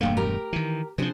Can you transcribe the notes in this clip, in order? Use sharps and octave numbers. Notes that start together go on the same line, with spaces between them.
E1 G2 A3 A#3 G5
G4 A#4 A#5
D#3 E3
C3 F3 D4 G#4 C5